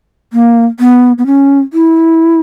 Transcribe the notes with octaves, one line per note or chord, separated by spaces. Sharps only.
A#3
B3
B3
C#4
E4